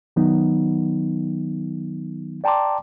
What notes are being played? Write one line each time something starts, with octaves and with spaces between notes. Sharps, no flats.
D#3 F#3 B3 D#4
D5 G5 A5 A#5 C6 D6